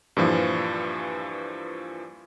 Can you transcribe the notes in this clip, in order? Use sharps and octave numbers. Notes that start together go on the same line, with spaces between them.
G2 A#2 E3 F3